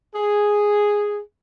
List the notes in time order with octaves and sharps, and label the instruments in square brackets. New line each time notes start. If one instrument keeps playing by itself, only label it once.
[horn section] G#4